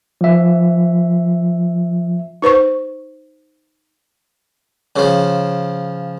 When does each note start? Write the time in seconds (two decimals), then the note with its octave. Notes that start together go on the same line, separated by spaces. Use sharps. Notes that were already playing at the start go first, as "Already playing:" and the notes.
0.21 F3 E5
2.42 D#4 B4 C5 C#6
4.96 C#3 F3